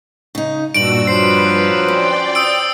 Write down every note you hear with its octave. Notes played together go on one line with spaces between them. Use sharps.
C#3 D#4
G2 A#2 D4 F#4 E6 D7 F#7
F3 F#3 B4 C5 C7
C#4 D5 G5
D#6 E6 D7